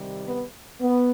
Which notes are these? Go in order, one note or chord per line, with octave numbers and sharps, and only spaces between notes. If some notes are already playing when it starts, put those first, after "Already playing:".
Already playing: C3 D#3 G3
B3
B3